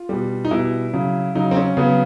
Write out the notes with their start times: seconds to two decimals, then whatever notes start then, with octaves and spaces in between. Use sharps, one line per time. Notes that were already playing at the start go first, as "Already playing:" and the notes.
Already playing: F4
0.09 B2 G3
0.45 D#4
0.51 B2 G3 E4
0.93 C#3 F#3
1.35 C#3 F#3 D#4
1.51 C4
1.56 C#4
1.77 C#3 F#3 B3